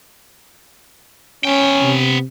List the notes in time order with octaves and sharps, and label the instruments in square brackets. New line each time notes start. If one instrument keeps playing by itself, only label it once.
[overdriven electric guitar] B3 G5 [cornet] C#4
[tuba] C3